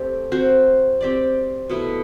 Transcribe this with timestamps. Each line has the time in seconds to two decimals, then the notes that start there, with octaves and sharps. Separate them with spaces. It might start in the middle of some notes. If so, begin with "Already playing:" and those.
Already playing: A3 C4 G4 D5
0.32 C4 F#4 C5
1.01 C4 G4 D5
1.69 B2 A3 E4